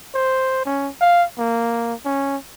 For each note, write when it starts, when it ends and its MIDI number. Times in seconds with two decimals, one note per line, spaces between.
0.15 0.65 72
0.65 0.89 61
1.01 1.24 77
1.38 1.94 58
2.05 2.37 61